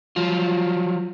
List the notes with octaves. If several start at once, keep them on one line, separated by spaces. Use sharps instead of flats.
F3 F#3 F4